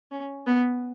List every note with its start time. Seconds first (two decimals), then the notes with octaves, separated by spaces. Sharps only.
0.11 C#4
0.47 B3